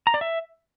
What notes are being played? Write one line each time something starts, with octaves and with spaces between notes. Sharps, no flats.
A#5
D5
E5